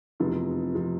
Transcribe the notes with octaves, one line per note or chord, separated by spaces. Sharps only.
F1 E2 C3 F3
C3 F3